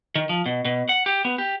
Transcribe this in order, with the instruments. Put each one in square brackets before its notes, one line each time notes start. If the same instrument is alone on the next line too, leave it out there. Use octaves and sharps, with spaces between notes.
[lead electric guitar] D#3
F3
B2
B2
F#5
G4
B3
G4